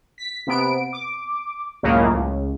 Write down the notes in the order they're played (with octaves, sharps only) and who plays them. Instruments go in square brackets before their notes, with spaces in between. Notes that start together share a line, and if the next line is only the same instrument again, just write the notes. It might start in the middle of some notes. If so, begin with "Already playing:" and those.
[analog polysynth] B6
C3 B3 D7
D6
C#2 F#2 A2 C#3 A#3
C#2